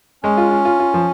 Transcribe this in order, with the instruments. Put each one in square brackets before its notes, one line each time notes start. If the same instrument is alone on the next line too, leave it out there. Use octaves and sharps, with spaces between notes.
[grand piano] G#3 [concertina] C#4
[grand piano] F4
F4
F4
F4
F3